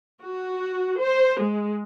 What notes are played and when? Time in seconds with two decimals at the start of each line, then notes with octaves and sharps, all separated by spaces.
0.22 F#4
0.99 C5
1.40 G#3